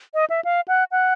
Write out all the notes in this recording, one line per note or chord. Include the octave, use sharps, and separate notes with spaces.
D#5
E5
F5
F#5
F#5